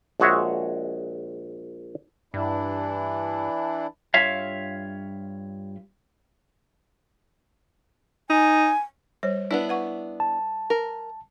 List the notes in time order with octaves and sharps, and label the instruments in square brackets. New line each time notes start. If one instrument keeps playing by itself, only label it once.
[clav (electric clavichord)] A#1 G#3 F#4 G#4 C#5 E5
[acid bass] G2 [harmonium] E3 D4 E4
[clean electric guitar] G2 F4 C#5 E5 F5
[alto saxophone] D#4 [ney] G#5
[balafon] G3 C5 C#5
[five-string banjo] B3 D4 E4
[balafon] B4 F#5 C#6
[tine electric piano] A5
[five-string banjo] A#4